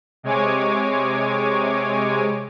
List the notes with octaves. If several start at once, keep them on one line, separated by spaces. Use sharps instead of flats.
C3 G#3 C#5 G#5 D6